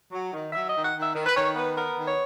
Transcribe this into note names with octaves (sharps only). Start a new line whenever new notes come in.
F#3
D#3
F#3 E5
D#3 D#5
F#5
D#3
E5
D#3
B4
D#3 C#5
B3 B4
B3 A#4
D#3
C#5